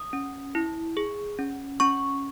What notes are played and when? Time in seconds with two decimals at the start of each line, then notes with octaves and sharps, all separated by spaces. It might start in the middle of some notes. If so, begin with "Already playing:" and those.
Already playing: D#6
0.13 C#4
0.55 E4
0.97 G#4
1.39 C#4
1.80 C#4 C#6